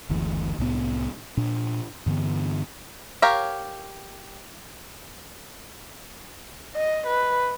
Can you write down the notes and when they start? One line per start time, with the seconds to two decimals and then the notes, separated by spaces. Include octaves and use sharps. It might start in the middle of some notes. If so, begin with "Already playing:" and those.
0.09 F#1 D2 E3
0.58 C2 A2 B3
1.37 A#2 D4
2.06 G2 D3 E3 B3
3.22 G4 A#4 C#5 F5
6.75 D#5
7.07 B4